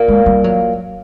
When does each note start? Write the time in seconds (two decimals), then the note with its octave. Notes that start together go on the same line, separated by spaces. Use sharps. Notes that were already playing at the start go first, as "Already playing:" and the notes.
Already playing: A#2 A#3
0.08 G#3
0.26 G3
0.44 F#3